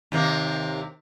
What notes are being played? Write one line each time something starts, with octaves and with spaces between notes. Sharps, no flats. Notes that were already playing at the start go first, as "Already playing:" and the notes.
D#2 C3 A#3